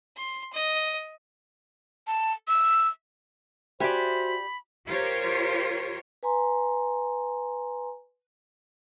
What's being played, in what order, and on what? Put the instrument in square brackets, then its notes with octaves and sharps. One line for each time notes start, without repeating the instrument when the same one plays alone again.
[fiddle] C6
D#5
[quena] A5
E6
[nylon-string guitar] F#4 E5 G#5 [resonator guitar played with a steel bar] G4 D5 [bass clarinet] C5 [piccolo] B5
[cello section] F4 G4 A#4 C5 C#5
[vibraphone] B4 G#5 A#5 C6